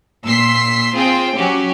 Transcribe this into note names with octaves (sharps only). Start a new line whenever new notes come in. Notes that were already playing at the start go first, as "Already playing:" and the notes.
A#2 C6 E6 B6 C7
C4 F4 G#4 C5 G5
F#3 C#4 F#4 G4